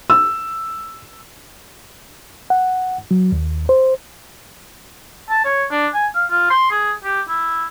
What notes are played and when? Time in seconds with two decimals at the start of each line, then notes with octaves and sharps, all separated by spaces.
0.10 E6
2.50 F#5
3.11 F#3
3.32 D#2
3.69 C5
5.29 A5
5.45 C#5
5.71 D4
5.94 G#5
6.15 F5
6.31 F4
6.50 C6
6.71 G#4
7.04 G4
7.28 E4